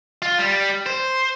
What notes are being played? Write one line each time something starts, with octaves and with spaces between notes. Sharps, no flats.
F4
G3
C5